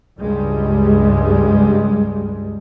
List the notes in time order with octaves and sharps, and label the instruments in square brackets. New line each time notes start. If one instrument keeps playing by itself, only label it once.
[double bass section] C#2 G2 G3 G#3